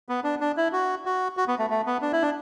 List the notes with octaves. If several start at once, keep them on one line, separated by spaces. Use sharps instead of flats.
B3
D4
D4
E4
F#4
F#4
F#4
B3
A3
A3
B3
D4
E4
D4